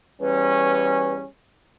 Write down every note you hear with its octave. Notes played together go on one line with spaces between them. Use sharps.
E2 G3 C#4 B4